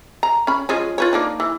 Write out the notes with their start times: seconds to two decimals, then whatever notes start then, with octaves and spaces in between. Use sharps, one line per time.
0.23 A#5
0.47 C#4 B5
0.69 F3 G#3 C#4
0.98 F4 B4 C#5
1.13 A#3 D4 D#4
1.40 E3